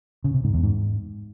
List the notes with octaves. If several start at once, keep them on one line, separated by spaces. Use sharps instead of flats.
C#3
C3
G#2
E2
G#2